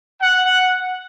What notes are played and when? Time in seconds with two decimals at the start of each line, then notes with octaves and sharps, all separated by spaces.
0.21 F#5